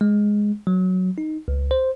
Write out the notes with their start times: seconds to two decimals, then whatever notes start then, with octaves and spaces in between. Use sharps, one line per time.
0.01 G#3
0.67 F#3
1.18 D#4
1.48 C#2
1.71 C5